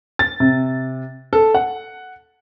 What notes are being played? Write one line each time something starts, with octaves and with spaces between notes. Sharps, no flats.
A6
C3
A4
F#5